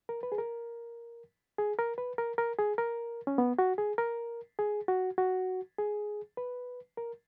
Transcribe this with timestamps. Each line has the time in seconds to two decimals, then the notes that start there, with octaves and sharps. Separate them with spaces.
0.09 A#4
0.23 B4
0.32 G#4
0.38 A#4
1.58 G#4
1.79 A#4
1.98 B4
2.18 A#4
2.38 A#4
2.59 G#4
2.78 A#4
3.27 C#4
3.38 B3
3.59 F#4
3.78 G#4
3.98 A#4
4.59 G#4
4.88 F#4
5.18 F#4
5.78 G#4
6.37 B4
6.97 A#4